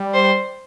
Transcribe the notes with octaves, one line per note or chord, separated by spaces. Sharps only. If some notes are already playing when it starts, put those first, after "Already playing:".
Already playing: G3
C5